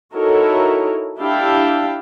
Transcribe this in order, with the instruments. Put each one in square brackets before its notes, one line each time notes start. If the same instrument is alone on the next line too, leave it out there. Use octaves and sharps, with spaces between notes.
[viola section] D#4 E4 F#4 A4 A#4 C#5
D4 E4 G4 F5 G5 A5